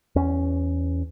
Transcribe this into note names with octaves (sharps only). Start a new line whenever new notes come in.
E2 C#4